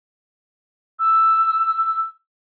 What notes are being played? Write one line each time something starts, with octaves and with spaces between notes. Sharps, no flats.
E6